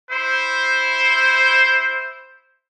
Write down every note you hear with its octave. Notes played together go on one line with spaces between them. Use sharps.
E4 C5